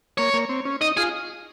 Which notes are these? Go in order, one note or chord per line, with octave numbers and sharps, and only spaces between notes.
A#3 C#5
A#3
C4
C#4
D#4 D#5
F4 G#4